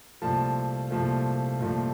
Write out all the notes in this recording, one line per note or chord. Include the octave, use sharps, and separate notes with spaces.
C2 A#2 F3 A3 A5
C2 A#2 F3 A3
C2 A#2 F3 A3